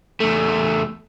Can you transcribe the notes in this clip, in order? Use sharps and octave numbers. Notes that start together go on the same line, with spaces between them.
E2 A3